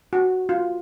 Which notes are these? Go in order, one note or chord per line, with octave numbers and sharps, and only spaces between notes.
F#4
F4